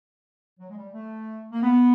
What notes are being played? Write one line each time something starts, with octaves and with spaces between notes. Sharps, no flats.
F#3
G#3
G3
A3
A#3
B3